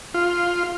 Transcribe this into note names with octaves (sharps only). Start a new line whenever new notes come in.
F4